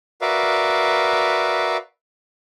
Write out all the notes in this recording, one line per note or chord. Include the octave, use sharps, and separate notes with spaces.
F#4 A#4 B4 D5 E5 F5